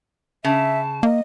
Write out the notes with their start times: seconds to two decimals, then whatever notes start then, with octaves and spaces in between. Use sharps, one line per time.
0.44 C#3 E5 A5
1.03 A#3 D#5